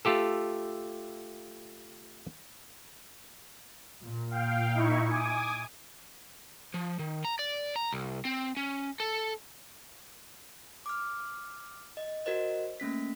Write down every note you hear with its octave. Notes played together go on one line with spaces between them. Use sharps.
A3 F4 G4 A4
A#2
F5 G5
D#4 E4 C#6
G#5 D6 D#6
F3
D#3
A#5
D5
A#5
C2
C4
C#4
A4
D6 F6
D#5
F#4 A#4 C5 D#5
A3 A#3 C#4 B6